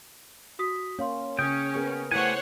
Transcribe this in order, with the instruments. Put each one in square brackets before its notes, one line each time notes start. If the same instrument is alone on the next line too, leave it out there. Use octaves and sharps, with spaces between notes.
[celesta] F#4 D#6 B6
[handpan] A#3 C#4 [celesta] C#5 F5 C6
[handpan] C#3 [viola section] C#4 [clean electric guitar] G5 [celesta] D#6
[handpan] B3 G#4 A#4
[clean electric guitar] A3 G4 G#5 [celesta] E4 [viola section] C5 C#5 F#5